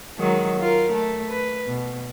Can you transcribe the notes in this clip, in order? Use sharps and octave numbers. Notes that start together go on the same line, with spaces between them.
D#3 F#3 G#3
F4 A#4
A3
B4
B2